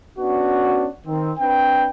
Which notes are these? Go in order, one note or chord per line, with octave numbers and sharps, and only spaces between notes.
B3 C#4 D4 F#4
D#3 C4
C4 D4 B4 G5